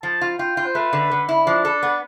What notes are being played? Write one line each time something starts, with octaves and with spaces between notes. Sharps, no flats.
F3 A5
F4
F4 G5
F4
C5
A3 B4
D3
D3
E4
F3 D4
A4
B3